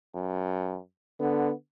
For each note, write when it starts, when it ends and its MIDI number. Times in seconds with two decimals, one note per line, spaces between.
0.15 0.79 42
1.20 1.51 50
1.20 1.53 59